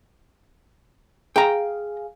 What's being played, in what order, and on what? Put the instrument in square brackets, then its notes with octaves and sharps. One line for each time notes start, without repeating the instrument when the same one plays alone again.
[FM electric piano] G#4 F5 [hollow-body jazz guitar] G5 A#5